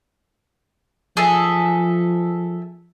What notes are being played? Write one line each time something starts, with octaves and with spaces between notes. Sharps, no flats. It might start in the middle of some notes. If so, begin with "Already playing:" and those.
F3 G#4 A4 E5